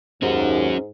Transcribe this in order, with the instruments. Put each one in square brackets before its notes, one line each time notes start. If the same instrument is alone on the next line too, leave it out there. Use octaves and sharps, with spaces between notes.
[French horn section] D#2 [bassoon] G#2 [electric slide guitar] C#4 F#4